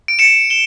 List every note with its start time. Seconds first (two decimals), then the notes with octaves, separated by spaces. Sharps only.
0.08 D7
0.19 C#7 E7
0.50 E7 G7